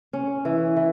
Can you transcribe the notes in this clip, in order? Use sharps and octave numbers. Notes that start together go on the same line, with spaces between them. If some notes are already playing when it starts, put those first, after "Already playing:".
C#4
E3
E3